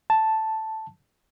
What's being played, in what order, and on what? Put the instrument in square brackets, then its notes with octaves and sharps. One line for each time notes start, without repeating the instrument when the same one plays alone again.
[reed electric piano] A5